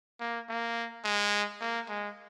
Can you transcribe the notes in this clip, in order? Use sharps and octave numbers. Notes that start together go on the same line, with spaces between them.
A#3
A#3
G#3
A#3
G#3